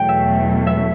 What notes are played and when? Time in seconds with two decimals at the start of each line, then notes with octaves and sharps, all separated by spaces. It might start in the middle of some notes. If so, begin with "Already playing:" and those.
Already playing: E2 B2 F#3 A3 G5
0.09 E5
0.67 E5